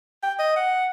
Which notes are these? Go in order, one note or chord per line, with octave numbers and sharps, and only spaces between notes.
G5
D#5
F#5